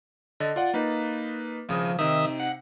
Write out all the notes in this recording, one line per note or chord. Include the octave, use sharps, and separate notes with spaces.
D3 D#5 A6
F4 D5 F#5
A#3 D#4 B4
G#1 C#3 F3 D#6
C3 D#3 D#4 E5 D#6
F#5